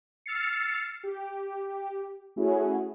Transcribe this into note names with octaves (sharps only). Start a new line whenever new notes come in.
E6 F6 A6 C7 C#7
G4
A3 C#4 E4 F#4 G#4